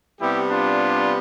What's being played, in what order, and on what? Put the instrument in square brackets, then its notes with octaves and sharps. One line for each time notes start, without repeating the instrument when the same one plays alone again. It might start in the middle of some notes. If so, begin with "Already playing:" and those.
[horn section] C3 G3 B3 E4 G4
D4 F4